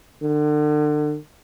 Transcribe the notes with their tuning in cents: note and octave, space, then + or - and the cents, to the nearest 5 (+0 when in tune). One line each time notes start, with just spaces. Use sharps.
D3 +35